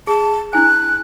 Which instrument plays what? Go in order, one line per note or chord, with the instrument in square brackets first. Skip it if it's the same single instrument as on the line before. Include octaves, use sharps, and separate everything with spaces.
[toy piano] G#4 [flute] A5
[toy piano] D4 E4 G#5 [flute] F#6